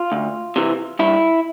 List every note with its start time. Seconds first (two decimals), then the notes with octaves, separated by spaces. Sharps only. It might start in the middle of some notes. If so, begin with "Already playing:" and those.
Already playing: F4
0.12 D2
0.56 C3 E3
0.99 G2 E4